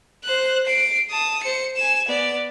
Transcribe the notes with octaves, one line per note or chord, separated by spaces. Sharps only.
C5 F#6
C7 D7
A5 D#6
C5 C#7
G#5 E7
B3 D5